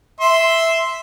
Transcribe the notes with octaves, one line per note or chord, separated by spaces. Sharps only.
E5 C6